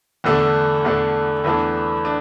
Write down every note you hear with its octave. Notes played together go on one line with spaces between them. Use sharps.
E2 D3 A3 D4
E2 D3 A3 D4
E2 E3 A3 D4
D4